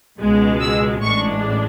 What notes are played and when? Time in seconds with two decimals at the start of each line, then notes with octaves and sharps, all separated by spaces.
0.19 C#2 B2 G#3
0.61 E6
1.01 A1 A2 G#3 D4 C#6